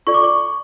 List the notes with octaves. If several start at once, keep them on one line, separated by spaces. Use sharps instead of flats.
F4 A4 D5 C#6
D6
C#6